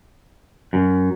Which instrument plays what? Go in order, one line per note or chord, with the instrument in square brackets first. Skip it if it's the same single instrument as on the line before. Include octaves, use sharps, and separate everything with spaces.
[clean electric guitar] F#2